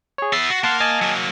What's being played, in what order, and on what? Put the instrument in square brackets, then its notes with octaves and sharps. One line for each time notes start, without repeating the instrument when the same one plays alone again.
[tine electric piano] G#4 C#5
[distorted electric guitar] B3 E5 [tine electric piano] A6 C7
[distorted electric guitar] F#4
[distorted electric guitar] A#3 F5 [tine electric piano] F#5 A5 C6
[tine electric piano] D#5 G#5 A5
[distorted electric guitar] F#3 A#3